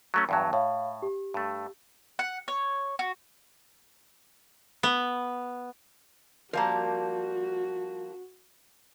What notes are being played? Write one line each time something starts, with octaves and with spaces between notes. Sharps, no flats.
F#3 A3 C#4
E2 G2 F#3 G5 A5
A2 C#5 F5
G4
G2 A3
F#5
C#5
F#4
B3
F3 G3 A#3 F#4 A#4 F5 A5